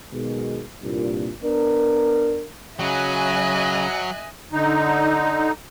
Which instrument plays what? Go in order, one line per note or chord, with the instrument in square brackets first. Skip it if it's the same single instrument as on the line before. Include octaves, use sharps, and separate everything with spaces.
[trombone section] B1 B2 D#3 G#3
C2 G2 A#2
B3 D4 A#4
[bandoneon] C#3 [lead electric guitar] F#3 [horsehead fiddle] D#5 [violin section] E5 G#5 F#6
[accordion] D3 D#4